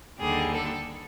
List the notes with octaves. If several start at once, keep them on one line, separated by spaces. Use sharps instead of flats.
D#2 D3 G3 G#4
A4